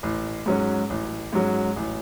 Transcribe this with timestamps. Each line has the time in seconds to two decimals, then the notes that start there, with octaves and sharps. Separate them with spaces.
0.03 A1
0.46 G#2 F#3 C#4
0.90 A1
1.33 G#2 F#3 C#4
1.76 A1